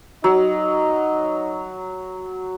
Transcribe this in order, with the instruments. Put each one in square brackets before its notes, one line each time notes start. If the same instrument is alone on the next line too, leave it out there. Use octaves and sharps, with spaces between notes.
[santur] F#3 [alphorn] D#4